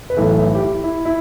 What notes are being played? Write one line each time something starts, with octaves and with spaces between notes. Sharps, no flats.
B4
B1 A2 E3 A4
E4
G4
E4
E4
E4